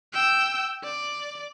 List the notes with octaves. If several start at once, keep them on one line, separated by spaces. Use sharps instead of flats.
G5 E6
D5